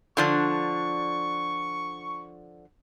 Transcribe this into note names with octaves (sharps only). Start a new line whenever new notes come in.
D3 F3 D4 C#6